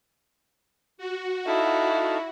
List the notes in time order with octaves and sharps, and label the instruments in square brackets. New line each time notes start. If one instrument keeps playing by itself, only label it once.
[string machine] F#4
[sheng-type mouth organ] D#4 A4 F5 [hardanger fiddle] E4